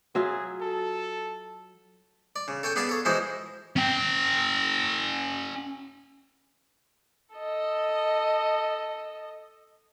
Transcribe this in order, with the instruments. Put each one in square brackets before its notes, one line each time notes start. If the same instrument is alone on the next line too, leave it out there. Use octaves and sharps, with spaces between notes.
[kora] F#3 F4 E5 [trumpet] G#4
[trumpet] A4
[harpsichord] D5
C#3
A4 C#5 G5 G#5
B3 G#4 D5 F5 A5
A4 C#5
E3 F3 G#3 F#4 C5 D#5
[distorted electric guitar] C#4 G5
[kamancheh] A4 D#5